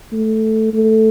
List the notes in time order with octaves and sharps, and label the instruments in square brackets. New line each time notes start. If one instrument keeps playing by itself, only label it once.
[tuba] A3
A3